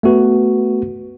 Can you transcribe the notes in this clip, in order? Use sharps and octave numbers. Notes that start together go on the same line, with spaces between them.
A3 B3 F#4 B4